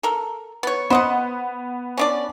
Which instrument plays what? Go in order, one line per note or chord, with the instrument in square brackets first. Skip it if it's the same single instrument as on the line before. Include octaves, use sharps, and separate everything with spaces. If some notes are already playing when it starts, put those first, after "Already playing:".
[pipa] A4 A#4
B3 C#5
[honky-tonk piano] B3 [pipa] C5 D#5 F#5
[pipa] C#4 D4 D5